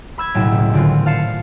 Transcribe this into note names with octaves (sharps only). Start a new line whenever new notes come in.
B5 E6 G#6
F#1 B1 A2 F#3 E7
C#2
D#1 D3 C4 F4
F5 A5 C7 C#7 E7